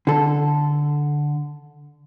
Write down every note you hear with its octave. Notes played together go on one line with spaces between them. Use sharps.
D3 A4